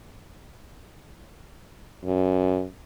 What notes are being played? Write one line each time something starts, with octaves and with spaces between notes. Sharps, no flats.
F#2